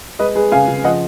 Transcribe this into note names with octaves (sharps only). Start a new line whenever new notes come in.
G#3 B4 D#5
G#3 G#4 B4
C#3 F5 G#5
C#3
F3 D#5 F#5